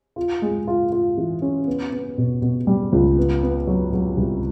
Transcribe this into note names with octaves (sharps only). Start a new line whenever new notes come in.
F4
G#3
F4
F4
E3
C#4
B3
B3
B2
B2
G3
C#2
B3
B3
F#3
F#3
C2